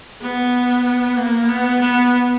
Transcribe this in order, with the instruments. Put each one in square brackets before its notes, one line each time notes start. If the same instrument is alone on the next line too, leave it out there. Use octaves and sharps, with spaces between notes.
[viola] B3
A#3
B3
B3